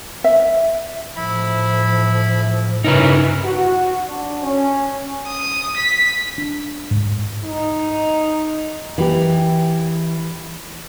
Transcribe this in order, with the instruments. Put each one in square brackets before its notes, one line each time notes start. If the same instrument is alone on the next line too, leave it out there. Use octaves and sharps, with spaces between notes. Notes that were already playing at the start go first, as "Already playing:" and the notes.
[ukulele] E5
[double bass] A2 F3 [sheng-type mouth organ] E4 B5
[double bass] G2 C#3 [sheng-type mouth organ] C#4 A#4 [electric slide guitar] D#4 E4 B4
[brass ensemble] F#4
D4
C#4
[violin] D#6
B6
[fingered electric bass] D4
G#2
[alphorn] D#4
[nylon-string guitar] E3 G4